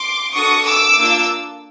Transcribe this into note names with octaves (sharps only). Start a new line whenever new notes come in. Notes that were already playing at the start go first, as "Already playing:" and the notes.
Already playing: C6 D6
D4 F#4 A4 C#6 D#6
D6 E6
A#3 D4 F4